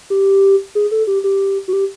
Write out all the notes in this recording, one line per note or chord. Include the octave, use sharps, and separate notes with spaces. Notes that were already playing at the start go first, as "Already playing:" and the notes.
G4
G#4
A4
G4
G4
F#4
G4